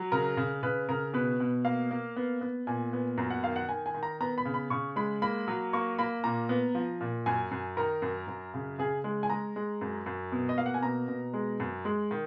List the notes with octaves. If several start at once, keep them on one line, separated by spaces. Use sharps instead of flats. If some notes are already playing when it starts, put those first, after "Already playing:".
Already playing: F#3
C#3 A#4
C#3
C#3 B4
C#3 A#4
B2 B4
B2
A#3 F5
A#3
B3
B3
A#2 G#5
B3
F#2 A#5
F#5
D#3 F5
F#5
D#3 G#5
G#5
D#3
A#5
B3 A#5
B5
C#3
B5
C#3 C#6
G#3 B5
A#3 B5
F#3
A#3 C#6
A#3 B5
A#2 A#5
B3
F3
A#2
F#2 G#5
F#2
D#3 A#4
F#2
F#2
C#3
C#3 G#4
G#3
G#5
G#3 A#5
G#3
F#2
F#2
B2
D#5
A#3 F5
F#5
G#5
B2 A#5
B2
G#3
F#2
G#3
D#3